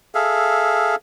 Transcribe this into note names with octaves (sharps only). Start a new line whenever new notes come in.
G#4 A4 E5 F5